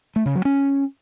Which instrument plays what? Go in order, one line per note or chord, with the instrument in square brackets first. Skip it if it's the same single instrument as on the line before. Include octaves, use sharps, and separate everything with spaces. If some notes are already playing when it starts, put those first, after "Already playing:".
[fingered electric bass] A3
C#3
F#3
C#4